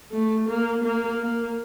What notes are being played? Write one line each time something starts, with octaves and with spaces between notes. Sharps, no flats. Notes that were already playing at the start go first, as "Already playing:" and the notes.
A3
A#3
A#3
A#3